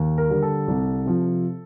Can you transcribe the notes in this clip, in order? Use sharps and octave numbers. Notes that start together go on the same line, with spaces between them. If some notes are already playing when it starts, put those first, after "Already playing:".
Already playing: D#2
A#4
D3 G3
A4
C2
C3 F3